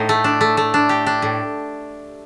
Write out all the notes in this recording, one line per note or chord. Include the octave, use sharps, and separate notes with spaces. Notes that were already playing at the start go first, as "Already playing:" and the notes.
Already playing: A2 D#4
A3
D4
A3
A3
D4
G4
D4
A2